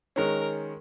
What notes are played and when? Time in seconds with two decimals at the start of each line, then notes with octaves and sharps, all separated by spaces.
0.16 D#3 G#3 C#4 A#4